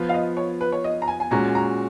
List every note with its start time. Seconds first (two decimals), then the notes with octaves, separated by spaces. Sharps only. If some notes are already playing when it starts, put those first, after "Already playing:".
Already playing: F3 B3 F4
0.09 F5
0.14 D#5
0.37 C#5
0.61 B4
0.72 C#5
0.84 D#5
1.02 A#5
1.08 G#5
1.20 G#5
1.31 A#2 G#3 C#4 F#4 A#5
1.55 A#5